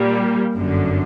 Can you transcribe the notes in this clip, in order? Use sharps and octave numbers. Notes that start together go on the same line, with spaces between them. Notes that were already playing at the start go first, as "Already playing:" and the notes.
Already playing: A#2 G3 A#3
G1 F#2 D3